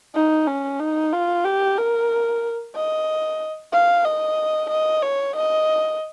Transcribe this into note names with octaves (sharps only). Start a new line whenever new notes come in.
D#4
C#4
D#4
F4
G4
A#4
D#5
F5
D#5
D#5
C#5
D#5